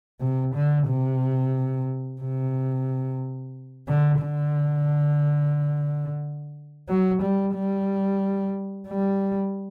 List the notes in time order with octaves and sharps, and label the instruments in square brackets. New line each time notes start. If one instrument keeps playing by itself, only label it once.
[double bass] C3
D3
C3
C3
D3
D3
F#3
G3
G3
G3